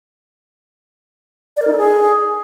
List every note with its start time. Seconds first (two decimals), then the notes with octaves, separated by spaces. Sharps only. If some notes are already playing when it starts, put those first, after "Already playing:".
1.57 D5
1.62 A#4
1.67 D#4
1.72 A4
1.78 G#4